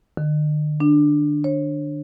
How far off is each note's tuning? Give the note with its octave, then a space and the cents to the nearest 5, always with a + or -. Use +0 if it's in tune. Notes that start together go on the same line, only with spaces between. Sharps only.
D3 +45
D4 +5
C#5 -40